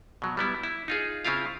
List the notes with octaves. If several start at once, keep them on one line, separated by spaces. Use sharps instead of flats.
B2 F#3
G3 B3 E4
E4
D#4 F4 G#4
C#3 C4 E4 F4 F5